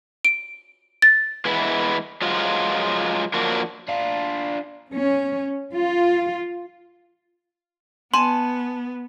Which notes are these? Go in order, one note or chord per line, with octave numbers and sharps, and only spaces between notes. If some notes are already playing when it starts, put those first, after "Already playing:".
D7
A6
E3 G#3 B3 E4
F3 F#3 G#3 F4
F3 F#3 A#3 D4 F#4
D4 F4
C#4
F4
B3 G#5 A5 C6